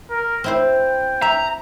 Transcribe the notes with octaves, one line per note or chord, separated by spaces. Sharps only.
A#4
C4 E4 C5 G5
E5 A#5